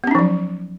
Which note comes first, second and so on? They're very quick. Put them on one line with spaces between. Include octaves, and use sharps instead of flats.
B3 C#4 D#4 F3 F#3